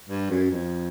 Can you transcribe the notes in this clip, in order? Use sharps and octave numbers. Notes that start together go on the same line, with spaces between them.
G2
F#2
F2